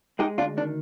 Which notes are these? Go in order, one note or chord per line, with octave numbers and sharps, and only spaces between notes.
G#3 D#4 G4
D2 D4 F4
D#3 D4